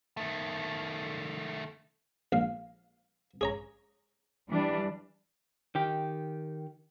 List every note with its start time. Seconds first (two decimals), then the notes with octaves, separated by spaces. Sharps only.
0.17 D#3 A3
2.32 A#1 F5
3.41 G#4 C#5 A#5
4.49 E3 G3 D4
5.75 D#3 G4